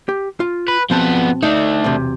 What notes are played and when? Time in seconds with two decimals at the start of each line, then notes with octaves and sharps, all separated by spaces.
0.09 G4
0.40 F4
0.68 B4
0.90 B1 F3 B3 C4 A5
1.43 A3 D4 D#4
1.84 B1 E2 C3